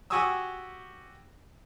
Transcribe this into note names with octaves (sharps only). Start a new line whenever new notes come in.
F#4 G4 G#5 C#6 D#6 E6